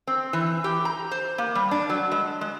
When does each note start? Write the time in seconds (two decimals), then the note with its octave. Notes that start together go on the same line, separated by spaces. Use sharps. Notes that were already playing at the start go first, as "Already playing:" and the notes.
0.07 C4
0.33 E3
0.64 G4
0.85 A#5
1.11 C5
1.38 A#3
1.55 G3
1.71 D4
1.90 F#3
2.12 G#3
2.41 G#3